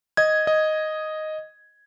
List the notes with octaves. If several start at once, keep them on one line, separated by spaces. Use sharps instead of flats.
D#5 G#6
D#5